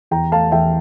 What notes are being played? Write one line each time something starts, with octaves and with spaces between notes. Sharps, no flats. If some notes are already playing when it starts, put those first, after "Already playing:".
E2 G5 A#5
A3 F5 A5
E2 E5 G5